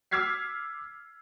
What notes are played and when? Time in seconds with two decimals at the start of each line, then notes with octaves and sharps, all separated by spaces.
0.11 D6 E6 F6 G#6 B6 C7